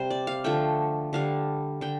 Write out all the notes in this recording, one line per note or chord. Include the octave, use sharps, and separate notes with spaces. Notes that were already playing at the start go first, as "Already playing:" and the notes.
Already playing: C3 G3 C5
D5
F5
D3 F3 A3 G5
D3 G3 F5
D3 G5